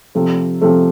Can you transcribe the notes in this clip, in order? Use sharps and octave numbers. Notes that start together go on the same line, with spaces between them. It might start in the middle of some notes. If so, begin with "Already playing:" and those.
C3 F3 A3
C3 F3 A3